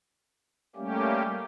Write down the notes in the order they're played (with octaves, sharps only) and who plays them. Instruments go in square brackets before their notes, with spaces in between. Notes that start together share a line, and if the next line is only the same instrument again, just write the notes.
[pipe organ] G3 A3 A#3 C#4 G4